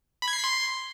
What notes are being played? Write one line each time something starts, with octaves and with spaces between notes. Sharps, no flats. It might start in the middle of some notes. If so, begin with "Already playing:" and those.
B5
G#6
C7
B6
C6